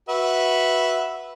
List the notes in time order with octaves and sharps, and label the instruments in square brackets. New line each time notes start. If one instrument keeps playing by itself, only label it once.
[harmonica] F#4 B4 E5